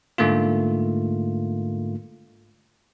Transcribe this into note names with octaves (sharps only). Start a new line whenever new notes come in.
G#2 D3 A3 A#3 F4